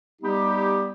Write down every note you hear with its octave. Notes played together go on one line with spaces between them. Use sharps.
G3 B3 D#4 G4